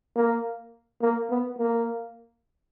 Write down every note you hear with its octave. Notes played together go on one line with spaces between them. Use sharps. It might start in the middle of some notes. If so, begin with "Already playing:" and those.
A#3
A#3
B3
A#3